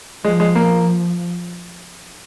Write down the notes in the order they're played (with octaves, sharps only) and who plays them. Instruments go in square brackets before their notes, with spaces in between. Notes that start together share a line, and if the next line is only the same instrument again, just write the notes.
[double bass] F3 [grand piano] G#3
[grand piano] G#3
A#3